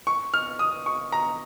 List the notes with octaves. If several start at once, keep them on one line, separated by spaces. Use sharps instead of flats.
C#6
F6
D#6
C#6
A#5